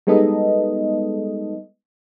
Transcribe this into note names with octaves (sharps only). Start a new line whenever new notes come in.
G3 G#3 B3 D#4 A4 D#5